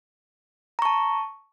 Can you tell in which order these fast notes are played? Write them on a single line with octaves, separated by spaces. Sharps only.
A#5 C#6 A5